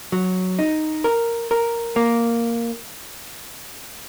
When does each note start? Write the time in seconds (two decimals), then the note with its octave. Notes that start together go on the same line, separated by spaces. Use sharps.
0.12 F#3
0.59 D#4
1.04 A#4
1.51 A#4
1.96 A#3